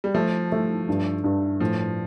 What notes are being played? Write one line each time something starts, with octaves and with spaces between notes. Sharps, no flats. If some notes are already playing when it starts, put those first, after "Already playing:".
G3
F3 A3
A3
G2
G2
A2 F3